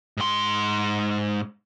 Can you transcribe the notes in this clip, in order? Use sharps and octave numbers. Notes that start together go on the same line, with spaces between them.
G#2 C6